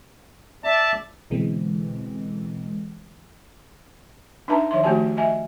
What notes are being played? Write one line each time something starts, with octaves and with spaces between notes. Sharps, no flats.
D5 E5 A5
B2 D3 E3 G#3 C4
D4 D#4 B4 E5 A5 A#5
D#3 F3 E5 C6
D#3 A3 F#4 G4 G#5 A5
D#5 E5 G#5